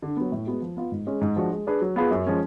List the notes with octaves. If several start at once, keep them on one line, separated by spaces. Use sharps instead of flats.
D3
F#3 B3
A2
G#3 B3 F#4
F3
B3 F4
G#2
G#3 C#4 G#4
G#2
F3 G#3 D4 F#4
G#3
D4 G#4 B4
F#3
B3 F4 G#4 B4
F#2
F3 G#3 C#4